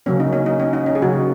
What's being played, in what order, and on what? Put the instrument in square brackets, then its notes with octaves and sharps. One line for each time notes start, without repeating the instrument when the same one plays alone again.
[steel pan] C#3 F#3 A#3 C#4
D#4
C#4
D#4
C#4
D#4
C#4
G#4
C#3 F#3 A#3 C#4 F#4